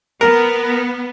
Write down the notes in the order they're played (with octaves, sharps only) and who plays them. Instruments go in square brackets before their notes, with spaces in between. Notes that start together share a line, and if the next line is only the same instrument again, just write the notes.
[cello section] B3 [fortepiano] A#4